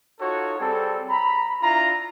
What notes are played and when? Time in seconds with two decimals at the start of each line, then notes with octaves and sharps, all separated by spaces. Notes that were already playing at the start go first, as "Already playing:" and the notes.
0.19 D#4 F4 F#4 A4 C#5
0.58 G3 C4 G#4 A4
1.09 A#5 B5
1.61 D4 E4 F4 A#5